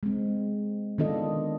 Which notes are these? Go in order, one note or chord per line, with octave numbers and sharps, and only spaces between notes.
G#3 C4
D#3 B3 D4 F4 A4 D#5